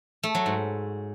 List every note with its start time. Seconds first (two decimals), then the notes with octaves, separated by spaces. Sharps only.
0.23 A3
0.35 F#3
0.46 G#2